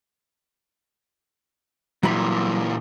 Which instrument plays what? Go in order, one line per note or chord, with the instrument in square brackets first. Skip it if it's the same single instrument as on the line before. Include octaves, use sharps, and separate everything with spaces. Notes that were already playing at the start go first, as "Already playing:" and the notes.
[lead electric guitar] A#2 E3 [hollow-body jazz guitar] F#3 G3 B5